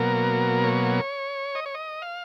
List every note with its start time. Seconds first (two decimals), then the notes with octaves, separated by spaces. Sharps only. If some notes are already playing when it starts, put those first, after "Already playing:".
Already playing: B2 F#3 A#3 A#4
0.64 C#5
1.55 D#5
1.66 C#5
1.75 D#5
2.02 F5